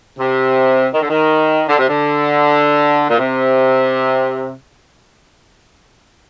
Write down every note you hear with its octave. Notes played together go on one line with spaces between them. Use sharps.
C3
D#3
D3
D#3
D3
C3
D3
A#2
C3